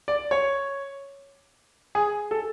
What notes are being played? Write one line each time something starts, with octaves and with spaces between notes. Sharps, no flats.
D5
C#5
G#4
A4